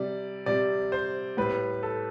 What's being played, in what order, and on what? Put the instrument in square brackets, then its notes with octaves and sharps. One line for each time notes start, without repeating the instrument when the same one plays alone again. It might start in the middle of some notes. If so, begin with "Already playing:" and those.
Already playing: [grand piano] C3 G3 D5
C3 G3 D5
C5
A2 G3 B4
A4